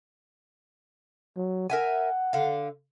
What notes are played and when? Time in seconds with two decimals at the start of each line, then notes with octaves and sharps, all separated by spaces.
1.36 F#3
1.70 A#4 E5 F#5 G#5
2.33 D3 F5